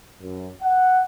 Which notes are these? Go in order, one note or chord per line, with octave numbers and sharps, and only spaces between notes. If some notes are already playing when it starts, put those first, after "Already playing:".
F#2
F#5